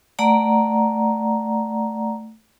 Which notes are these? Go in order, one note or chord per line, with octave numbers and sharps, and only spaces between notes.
A3 D5 F#5 A#5